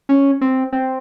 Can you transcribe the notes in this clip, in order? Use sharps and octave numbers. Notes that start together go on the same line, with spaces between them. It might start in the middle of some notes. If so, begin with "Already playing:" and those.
C#4
C4
C4